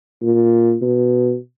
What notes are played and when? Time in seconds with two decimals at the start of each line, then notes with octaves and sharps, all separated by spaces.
0.22 A#2
0.82 B2